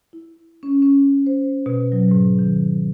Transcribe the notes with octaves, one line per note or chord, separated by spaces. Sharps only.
E4
C#4
C#4
C5
B2
F#3
G#2
D#3